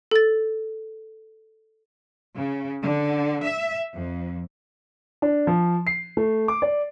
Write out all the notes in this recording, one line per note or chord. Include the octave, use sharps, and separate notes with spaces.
A4 A6
C#3
D3
E5
F2
D4
F3
C7
A3
D6
D5